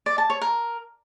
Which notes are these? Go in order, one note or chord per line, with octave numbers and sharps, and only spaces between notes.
D5
A5
C#5
A#4